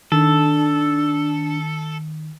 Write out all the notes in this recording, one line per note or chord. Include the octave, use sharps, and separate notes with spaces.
D#3 D4 A4